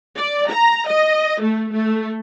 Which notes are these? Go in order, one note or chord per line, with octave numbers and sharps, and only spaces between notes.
D5
A#5
D#5
A3
A3